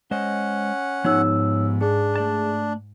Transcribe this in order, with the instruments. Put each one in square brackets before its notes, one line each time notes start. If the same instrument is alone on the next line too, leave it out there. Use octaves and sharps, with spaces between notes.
[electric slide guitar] G#3 C5 D#5 [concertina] C#4 F#5
[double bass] G#2 [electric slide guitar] F3 B3 G4 [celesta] D#4 C#5 E6
[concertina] D4 [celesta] G#4
[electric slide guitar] A3 D5 A5